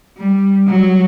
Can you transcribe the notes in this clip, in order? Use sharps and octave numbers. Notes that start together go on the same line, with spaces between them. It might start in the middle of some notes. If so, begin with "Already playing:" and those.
G3
F#3